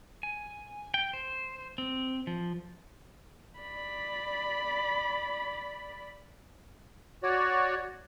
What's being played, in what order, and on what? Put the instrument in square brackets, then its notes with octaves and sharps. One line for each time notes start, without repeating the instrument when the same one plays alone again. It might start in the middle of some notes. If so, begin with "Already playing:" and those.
[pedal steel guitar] G#5
G5
C5
C4
F3
[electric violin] D5 B5
[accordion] F#4 C#5 D5